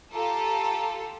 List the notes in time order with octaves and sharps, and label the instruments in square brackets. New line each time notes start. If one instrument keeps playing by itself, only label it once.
[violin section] F4 G4 A4 [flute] A#5